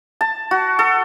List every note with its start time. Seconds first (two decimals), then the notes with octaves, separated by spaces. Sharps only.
0.21 A5
0.51 F#4
0.79 A4